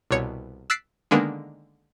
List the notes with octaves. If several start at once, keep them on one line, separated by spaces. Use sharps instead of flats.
C2 B2 C#5 C#7
E6 F#6 A6 B6 C7 D7
D3 D#3 G#3 A#3 B3 D4